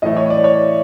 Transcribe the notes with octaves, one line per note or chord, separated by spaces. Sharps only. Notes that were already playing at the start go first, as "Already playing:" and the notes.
A2 E3 A3 D#5
C#5
D5
C#5